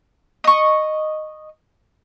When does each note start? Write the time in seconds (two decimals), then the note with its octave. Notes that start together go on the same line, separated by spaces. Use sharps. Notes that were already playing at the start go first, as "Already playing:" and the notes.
0.44 D#5 C#6